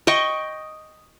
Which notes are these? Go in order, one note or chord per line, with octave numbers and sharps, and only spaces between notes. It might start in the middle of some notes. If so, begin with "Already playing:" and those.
D#5 G5 C#6